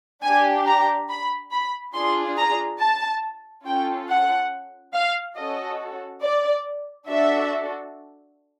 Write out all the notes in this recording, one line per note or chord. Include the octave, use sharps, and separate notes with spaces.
D4 G4 G#5
A#5
B5
B5
D4 F4 G#4 C6
A#5
A5
C#4 F4 A4 G5
F#5
F5
C#4 F#4 A4 D#5
D5
D4 F#4 A4 E5